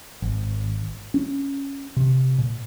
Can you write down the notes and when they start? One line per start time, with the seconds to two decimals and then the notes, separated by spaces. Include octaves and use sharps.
0.22 G#1
1.14 C#4
1.96 C3
2.38 A#2